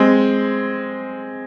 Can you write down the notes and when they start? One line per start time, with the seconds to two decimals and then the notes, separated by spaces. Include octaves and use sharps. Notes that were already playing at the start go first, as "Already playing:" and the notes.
Already playing: G#3 C4